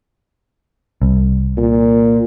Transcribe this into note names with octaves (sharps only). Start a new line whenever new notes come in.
C2
A#2